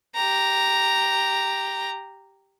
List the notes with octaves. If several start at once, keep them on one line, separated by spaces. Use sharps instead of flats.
G4 A#5